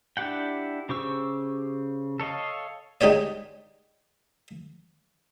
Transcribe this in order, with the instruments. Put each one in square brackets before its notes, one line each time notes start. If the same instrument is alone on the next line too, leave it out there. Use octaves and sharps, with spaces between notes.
[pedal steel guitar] D4 E4 G4 F#5 G5
C#3 G4 C5 C#6 E6
A4 C#5 D#5 F5
[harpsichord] G#3 D#4 G4 C#5 D5